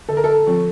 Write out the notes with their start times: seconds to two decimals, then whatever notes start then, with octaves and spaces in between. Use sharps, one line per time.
0.09 D3 A4
0.17 A#4
0.24 A4
0.46 F3 C4 F4